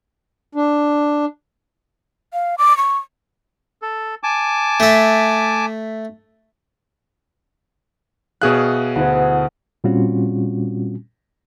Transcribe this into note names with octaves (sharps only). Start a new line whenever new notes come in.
D4
F5
D6
C#6
A4
G#5 A5 D6
A3 E5
B2 G#4 C#5 E5 F5 F#6
D2 E4 F#5
A#2 G3 C4 C#4 F4 F#4